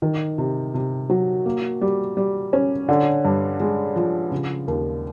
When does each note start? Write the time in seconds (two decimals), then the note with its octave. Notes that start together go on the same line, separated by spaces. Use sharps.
0.02 D#3
0.38 C3
0.74 C3
1.10 F#3
1.45 A#3
1.81 G3
2.17 G3
2.53 C#4
2.89 D3
3.25 G2
3.60 G#3
3.96 F3
4.31 C#3
4.67 D#2